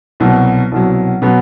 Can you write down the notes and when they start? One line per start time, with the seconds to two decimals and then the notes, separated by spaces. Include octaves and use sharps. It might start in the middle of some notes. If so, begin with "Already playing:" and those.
0.20 C2 B2 F#3
0.72 C2 B2 F#3
1.22 B2 F#3 B3